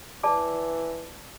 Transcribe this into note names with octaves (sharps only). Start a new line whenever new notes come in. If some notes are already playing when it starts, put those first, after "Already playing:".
E3 D5 A5 D6